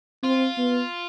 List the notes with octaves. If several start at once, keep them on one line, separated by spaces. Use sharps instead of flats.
C4 F4
B3